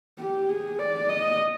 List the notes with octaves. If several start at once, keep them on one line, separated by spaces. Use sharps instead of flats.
G4
G#4
D5
D#5